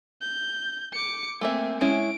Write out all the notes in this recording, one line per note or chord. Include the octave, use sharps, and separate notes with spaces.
G6
D6 C#7
A3 A#3 C4 E5 G#5
G#3 C#4 E4 D7